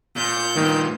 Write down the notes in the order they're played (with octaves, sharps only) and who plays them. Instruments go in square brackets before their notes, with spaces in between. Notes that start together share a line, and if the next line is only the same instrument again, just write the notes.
[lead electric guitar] A#2 [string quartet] G6
[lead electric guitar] G2 A#2 [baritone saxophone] D#3